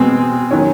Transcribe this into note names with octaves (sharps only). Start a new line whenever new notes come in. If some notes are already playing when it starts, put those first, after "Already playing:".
Already playing: B2 G#3 C4
D#3 F#3 C#4